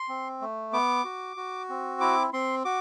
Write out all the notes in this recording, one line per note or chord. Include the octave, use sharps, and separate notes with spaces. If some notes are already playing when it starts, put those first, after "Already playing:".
Already playing: C6
C4
A3
B3 D6
F#4
F#4
C4
E4 D6
C4 C6
F#4 D6